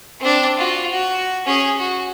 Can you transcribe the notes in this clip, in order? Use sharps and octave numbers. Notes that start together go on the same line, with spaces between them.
C4 D4
F4 F#4
F#4
C#4 G#4
F#4